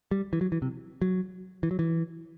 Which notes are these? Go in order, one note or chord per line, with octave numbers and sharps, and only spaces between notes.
G3
E3
F#3
E3
C3
F#3
E3
F#3
E3